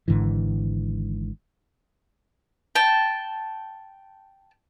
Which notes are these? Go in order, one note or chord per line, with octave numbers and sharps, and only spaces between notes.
G#1 G#2 D3 E3
G5 A5